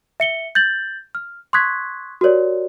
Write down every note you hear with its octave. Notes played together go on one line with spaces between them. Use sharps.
E5 C#7 G7
G6 A6 F#7
F6
C6 C#6 D#6 F#6 G#6 B6
F#4 G4 A#4 C#5 D5